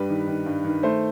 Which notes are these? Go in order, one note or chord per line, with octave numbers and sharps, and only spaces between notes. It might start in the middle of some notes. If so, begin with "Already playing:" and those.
Already playing: G2 G3 B4
D#3
D#3
G2
D#3
A3 C5